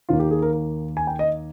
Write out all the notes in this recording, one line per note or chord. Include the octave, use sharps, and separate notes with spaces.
D#2 D#3 A#3 F4
G4
G#4
A#4
A#4
G#5
G5
D#5